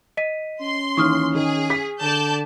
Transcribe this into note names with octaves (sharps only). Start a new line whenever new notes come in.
D#5 B6 D#7
C#4 C6
D#2 E3 C#6 D#6 F6
D#3 G#4
B6
D3 D5 A5 G6